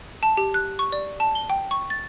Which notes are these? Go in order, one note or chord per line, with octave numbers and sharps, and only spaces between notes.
A5
G4
F#6
C#6
D5
A5
G7
G5
C#6
A6